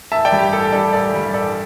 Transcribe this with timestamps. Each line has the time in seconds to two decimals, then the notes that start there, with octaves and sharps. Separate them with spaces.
0.12 A1 E5 A5
0.25 D5 G5
0.32 G2 G3
0.39 G4
0.52 A1 A4
0.72 G2 G3 A4 D5
0.93 A1 A4 D5
1.14 G2 G3
1.34 A1 A4 D5